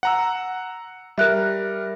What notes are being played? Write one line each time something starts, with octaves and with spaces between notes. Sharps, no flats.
F#5 A#5 E6
G3 A#4 E5 F#6